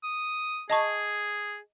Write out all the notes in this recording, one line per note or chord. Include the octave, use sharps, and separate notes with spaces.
D#6
G#4 D#5 A5 C#6